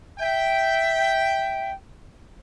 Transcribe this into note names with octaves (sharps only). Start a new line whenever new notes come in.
E5 G5